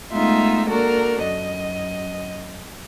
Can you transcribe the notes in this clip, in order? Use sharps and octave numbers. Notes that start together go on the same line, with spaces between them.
G#3 A3 B3 D#4 F4 E5
A#3 D4 F#4 A4 A#4
F#2 D#5